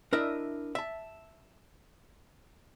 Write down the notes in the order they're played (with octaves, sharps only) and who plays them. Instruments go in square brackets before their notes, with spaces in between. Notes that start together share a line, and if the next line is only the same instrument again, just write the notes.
[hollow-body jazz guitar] D4 E4 A#4 D#5 E5
E5 A5